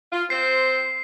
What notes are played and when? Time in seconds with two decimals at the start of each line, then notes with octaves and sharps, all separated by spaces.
0.12 F4
0.30 C4 C5 C7